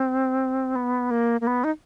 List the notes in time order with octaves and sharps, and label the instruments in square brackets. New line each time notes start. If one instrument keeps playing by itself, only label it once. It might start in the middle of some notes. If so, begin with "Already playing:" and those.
Already playing: [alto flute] C4
B3
A#3
A#3
B3
D#4